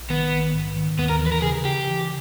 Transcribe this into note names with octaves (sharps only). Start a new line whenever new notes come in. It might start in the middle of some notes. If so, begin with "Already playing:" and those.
Already playing: A#1
D#3 B3
A#1
G#2
D#3
D#2 B3
A#4
E3
B4
A#4
C#3 G#4
C#3 G4
E3